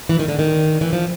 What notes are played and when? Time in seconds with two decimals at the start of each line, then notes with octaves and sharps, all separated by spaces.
0.09 E3
0.19 D#3
0.28 D3
0.39 D#3
0.81 E3
0.93 F3